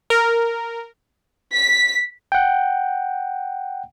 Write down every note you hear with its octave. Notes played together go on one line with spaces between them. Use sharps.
A#4
B6
F#5 G5